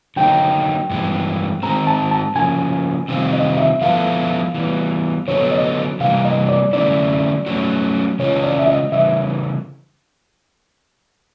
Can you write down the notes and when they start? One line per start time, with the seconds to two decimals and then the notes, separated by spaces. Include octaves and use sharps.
0.16 D3 F#3 A#3 D#4 G5
0.90 G2 E3 G#3
1.63 D#3 G#3 C4 A#5
1.87 A5
2.11 A5
2.35 C#3 F3 A#3 G#5
3.08 C3 D#3 G3 C4 F4
3.33 D#5
3.57 E5
3.81 F3 G#3 B3 E4 A4 F5
4.54 E3 G3 B3
5.28 D3 F#3 B3 E4 A4 C#5
5.51 D#5
6.00 C3 E3 G3 A#3 F5
6.25 D#5
6.49 D5
6.73 D3 F#3 A3 C#4 E4 D5
7.46 F#3 A3 C#4 F#4
8.19 C#3 E3 G#3 C#4 F4 C#5
8.44 D5
8.59 E5
8.68 D#5
8.92 C#3 E3 G3 E5